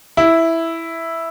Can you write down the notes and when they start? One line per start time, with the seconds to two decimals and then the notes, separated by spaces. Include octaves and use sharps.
0.17 E4